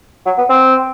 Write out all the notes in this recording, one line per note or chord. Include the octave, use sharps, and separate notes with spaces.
F#3
B3
C4